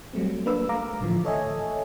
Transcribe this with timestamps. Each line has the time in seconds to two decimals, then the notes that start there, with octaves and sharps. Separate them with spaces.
0.13 F#3 G3 A3 C4
0.46 A#3 D4 B4 E6
0.69 A3 F5 A#5 D6
1.01 A2 D3 E3 F3
1.25 A4 C#5 D#5 E5 G#5